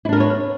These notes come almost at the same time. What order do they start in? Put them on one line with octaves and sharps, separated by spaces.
E4 D4 A#4 B3 C#5